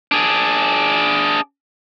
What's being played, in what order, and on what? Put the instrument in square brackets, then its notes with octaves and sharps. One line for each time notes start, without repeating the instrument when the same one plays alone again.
[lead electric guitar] D4 G#4